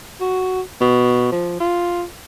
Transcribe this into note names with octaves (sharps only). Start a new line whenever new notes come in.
F#4
B2
F3
F4